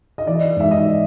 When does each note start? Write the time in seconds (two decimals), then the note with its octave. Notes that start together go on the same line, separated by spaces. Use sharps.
0.18 D#5
0.27 E3 D5
0.57 G#2 E5
0.71 D#5